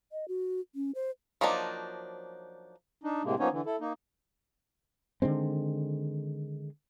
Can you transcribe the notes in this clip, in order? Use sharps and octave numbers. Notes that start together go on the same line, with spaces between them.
D#5
F#4
C#4
C5
F3 F#3 A#3 D4 D#4
D4 D#4
A2 C3 G#3 A#3
F3 A#3 B3 C#4 D#4 C#5
D3 E3
E4 A4
A#3 D#4
D3 D#3 G#3 C4